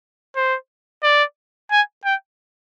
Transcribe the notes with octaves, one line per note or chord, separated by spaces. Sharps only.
C5
D5
G#5
G5